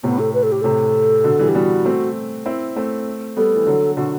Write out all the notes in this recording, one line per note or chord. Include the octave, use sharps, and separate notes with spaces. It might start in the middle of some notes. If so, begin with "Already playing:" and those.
A2 C3 B3
A4
B4
A4
G4
A2 C3 A4
B2 D3
E3 G3
G4
G3 B3 F#4
A3 C4
C4 E4
A3 C4
G3 B3 A4
E3
D3 F#3
B2 D3 F#4